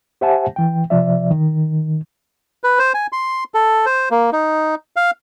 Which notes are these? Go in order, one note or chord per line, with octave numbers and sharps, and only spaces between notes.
G4 C5 E5 F#5 G#5 A5
E3 G5
C3 F3 D5 E5
D#3
B4
C5
G#5
C6
A4
C5
A#3
D#4
F5